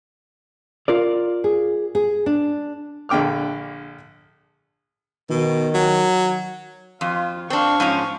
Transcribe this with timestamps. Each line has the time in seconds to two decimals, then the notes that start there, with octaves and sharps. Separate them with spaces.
0.88 F4 A#4 D5
1.44 G#4
1.95 G#4
2.26 D4
3.09 A#1 D3 G5 D6 F6
5.30 B2 D#3
5.74 F#3
7.01 F2 F4
7.50 C4 D4 F5 C#6
7.80 G#2 F3 C#4